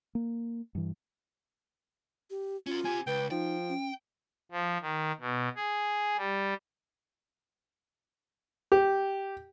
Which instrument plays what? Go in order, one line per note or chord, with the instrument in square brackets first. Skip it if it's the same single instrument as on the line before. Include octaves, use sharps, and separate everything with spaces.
[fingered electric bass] A#3
G2 E3
[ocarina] G4
[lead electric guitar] C#4 F#4 [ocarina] F4
[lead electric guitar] C4 G4 [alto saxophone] G#5
[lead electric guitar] C#2 [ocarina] B4 [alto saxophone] G5
[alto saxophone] F3 [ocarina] D#4 [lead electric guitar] G5
[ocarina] C#4
[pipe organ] F3
D#3
B2
G#4
G3
[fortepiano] G4